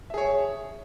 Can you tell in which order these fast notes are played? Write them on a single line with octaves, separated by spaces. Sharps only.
E5 G#4 C#5